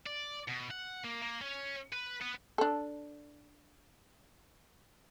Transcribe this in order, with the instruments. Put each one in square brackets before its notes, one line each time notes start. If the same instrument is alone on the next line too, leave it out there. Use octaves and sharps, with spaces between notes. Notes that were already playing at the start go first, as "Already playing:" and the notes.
[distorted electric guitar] D5
B2
F#5
A#3
A#3
C#4
B4
B3
[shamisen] D4 A4